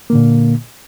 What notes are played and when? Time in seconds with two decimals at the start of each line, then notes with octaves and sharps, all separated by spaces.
0.10 A#3
0.13 D3
0.15 A#2